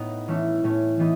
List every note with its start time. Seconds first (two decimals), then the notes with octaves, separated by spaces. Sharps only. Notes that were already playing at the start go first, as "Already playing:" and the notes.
Already playing: A2 B3 D#4
0.28 E3 A3 C#4
0.64 A2 A3 C#4
0.99 E3 B3 D#4